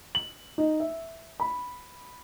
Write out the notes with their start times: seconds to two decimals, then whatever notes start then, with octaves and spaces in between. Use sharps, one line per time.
0.15 F#7
0.58 D#4
0.80 E5
1.40 B5